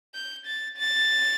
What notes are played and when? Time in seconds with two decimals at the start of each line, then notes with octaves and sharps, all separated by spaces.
0.15 G6
0.46 A6
0.78 A6